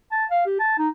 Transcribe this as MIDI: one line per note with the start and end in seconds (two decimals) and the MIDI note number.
0.11 0.25 81
0.31 0.42 77
0.46 0.55 67
0.59 0.78 81
0.78 0.88 63